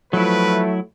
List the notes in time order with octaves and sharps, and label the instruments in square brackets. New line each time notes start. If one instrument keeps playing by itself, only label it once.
[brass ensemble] F3 B4 [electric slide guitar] F#3 E4 [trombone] A3